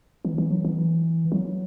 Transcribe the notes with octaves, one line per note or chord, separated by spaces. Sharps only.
E3
E3
F#3
E3
F#3